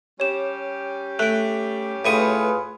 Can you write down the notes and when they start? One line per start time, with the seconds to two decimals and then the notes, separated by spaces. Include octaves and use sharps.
0.20 G3 C#4 G4 C#5 E7
1.19 A3 F#6 D7
2.05 A2 F4 G#4 B4 C#6 D#6